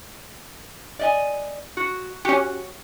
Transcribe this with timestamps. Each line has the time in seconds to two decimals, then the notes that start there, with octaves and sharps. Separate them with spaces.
0.99 D5 D#5 G#5
1.77 F#4
2.25 C#4 F#4 G4